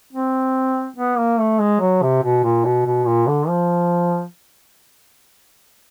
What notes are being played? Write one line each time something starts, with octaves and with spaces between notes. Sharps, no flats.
C4
B3
A#3
A3
G#3
F#3
C3
B2
A#2
B2
B2
A#2
D3
F3